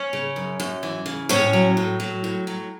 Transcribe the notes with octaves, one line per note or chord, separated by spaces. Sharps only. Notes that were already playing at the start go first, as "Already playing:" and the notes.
Already playing: C#4 C#5
C#3
F#2
F#2
E3
C#3
A2 C#4 C#5
F#3
A2
F#3
A2
F#3